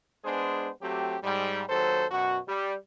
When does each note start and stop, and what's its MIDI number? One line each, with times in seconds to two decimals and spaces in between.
0.24 0.69 56
0.24 0.69 59
0.24 0.69 62
0.24 0.69 68
0.24 0.69 72
0.81 1.16 54
0.81 1.16 57
0.81 1.16 60
0.81 1.16 67
1.22 1.63 44
1.22 1.63 55
1.68 2.05 39
1.68 2.05 54
1.68 2.05 69
1.68 2.05 72
2.11 2.38 42
2.11 2.38 47
2.11 2.38 66
2.47 2.74 55